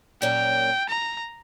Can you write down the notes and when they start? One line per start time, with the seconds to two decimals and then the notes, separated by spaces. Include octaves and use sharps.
0.22 A#2 F#3 C#4 F#4 A#4 G5
0.89 A#5